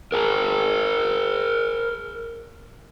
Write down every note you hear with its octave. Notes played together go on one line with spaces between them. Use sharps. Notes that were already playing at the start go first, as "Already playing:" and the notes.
G#4 A#4